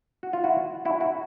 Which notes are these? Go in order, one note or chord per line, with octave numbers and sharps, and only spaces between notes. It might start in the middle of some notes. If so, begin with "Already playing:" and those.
F#4
F4
E4 F#4
E4 F#4
E4 F#4